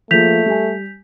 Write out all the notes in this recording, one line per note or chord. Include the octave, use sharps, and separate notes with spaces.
F3 A3 A#3 G#4 G6 B6 F7
G3 G#5